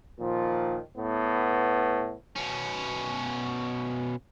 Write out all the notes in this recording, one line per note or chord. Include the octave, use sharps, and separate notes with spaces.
A#2 D#3 F3
A2 B3
B2 C#4